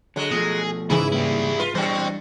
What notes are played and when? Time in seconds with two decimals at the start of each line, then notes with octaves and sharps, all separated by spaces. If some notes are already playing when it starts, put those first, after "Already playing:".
0.16 D3 F#3 G#3
0.31 B2 F3 A3 G#4
0.90 G#2 C#3 E3 E4 G#4 E5
1.12 G2 G3 A#3 E4 G5
1.59 F4 B4
1.75 A#2 E3 G3 D4 C5 G5